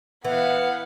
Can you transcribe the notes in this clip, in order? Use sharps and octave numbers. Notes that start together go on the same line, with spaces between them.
E3 B3 F5 F#5